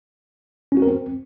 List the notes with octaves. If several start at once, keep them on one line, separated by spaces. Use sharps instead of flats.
C#4
F#4
A#4
C4